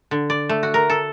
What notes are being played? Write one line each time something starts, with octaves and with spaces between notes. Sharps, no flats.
D3
D5
A3
F#4
A#4
A4